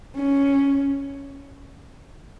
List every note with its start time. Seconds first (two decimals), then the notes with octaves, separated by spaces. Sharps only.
0.16 C#4